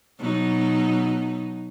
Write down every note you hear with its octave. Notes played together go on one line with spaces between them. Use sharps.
B2 F#3 D#4